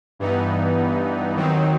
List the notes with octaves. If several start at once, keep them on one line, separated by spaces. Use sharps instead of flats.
G2 E3 B3 D#4
D#2 D#3 F#3 C4 D#4